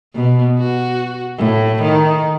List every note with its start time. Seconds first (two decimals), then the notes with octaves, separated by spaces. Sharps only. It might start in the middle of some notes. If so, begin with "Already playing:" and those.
0.14 B2
0.58 F#4
1.38 A2
1.82 D#3